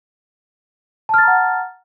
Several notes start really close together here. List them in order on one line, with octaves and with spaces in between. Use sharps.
A5 F6 A6 A#5 F#5